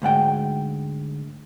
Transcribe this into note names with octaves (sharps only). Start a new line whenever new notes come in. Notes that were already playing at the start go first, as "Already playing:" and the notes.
D2 G#2 F#5 G5